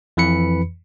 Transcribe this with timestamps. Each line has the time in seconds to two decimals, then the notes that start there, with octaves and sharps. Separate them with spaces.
0.17 F2 E3 B4 B5 C#7